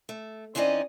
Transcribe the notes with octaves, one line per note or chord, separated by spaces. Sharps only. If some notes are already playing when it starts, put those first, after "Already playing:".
A3
E3 C4 C#4 D#4 D5 D#5